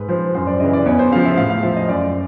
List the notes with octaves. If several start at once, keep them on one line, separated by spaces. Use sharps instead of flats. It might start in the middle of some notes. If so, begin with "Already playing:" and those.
Already playing: G#2 B4
F3 C5
F#2 C5
D5
C#3 E3 D#5
D5
E2 C#5
C5
C#3 F3 F5
E5
A2 F5
F5
F3 E5
D#5
F#2 D5